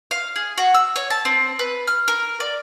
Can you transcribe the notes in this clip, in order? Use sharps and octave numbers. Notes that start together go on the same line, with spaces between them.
F5
G#4
F#4
E6
C#5
A5
C4
B4
F6
A#4
D5